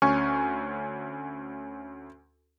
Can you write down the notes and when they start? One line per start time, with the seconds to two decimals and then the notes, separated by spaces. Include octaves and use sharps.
0.02 D2 C#4 G#5 C#6 F6